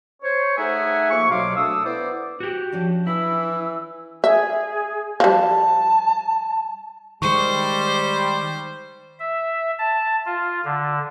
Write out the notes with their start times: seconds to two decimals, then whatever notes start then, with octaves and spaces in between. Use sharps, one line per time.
0.22 C5 C#5
0.57 A3 D#4 G#4 E5 F#5 G#5
1.10 F3 A#3 E5 C#6
1.30 C2 B2 F#3 F5 C6 D6
1.56 A3 D4 D#6 E6
1.84 B3 E4 C5 D5
2.40 F#4 G4
2.72 F3 C#4 D4
3.07 E3 E4 E6
4.24 G#4 E5
5.20 F3 G3 A5
7.22 D#3 G3 G#3 C5 C#6 C#7
9.20 E5
9.79 A5
10.26 F4
10.65 D3